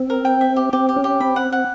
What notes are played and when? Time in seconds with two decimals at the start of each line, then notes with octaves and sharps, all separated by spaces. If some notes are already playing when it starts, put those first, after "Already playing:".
Already playing: C4
0.10 A#4
0.25 G5
0.41 E5
0.56 G4
0.73 C4 G4
0.89 G4
0.96 C#4
1.04 G4
1.20 C4 B5
1.36 F#5
1.52 F#5